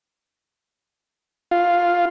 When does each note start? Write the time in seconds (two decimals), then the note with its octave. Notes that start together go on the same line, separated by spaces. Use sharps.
1.51 F4